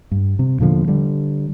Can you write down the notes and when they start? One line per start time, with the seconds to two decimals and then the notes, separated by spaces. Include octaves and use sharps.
0.11 G2
0.39 C3
0.59 E2 A#2 D3 F3
0.88 D3 G3